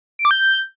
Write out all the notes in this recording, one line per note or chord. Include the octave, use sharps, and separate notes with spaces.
D7
D6
G6